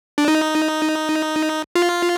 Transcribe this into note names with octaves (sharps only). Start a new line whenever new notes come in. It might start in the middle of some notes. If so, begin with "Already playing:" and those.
D4
D#4
F4